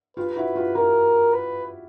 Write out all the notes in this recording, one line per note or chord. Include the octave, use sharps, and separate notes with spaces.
F4 G4 B4
E4 F#4
F4 G4
F4 G4 A#4
B4